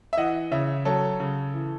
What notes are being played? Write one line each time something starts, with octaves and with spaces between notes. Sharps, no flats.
E5
E3 D#5 F#5
C#3 C#5 E5
F#3 A4 C#5
C#3
E3